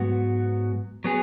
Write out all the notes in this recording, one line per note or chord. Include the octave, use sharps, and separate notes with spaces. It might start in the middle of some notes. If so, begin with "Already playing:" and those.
Already playing: G#2 F#3 B3 F#4
F#3 B3 G#4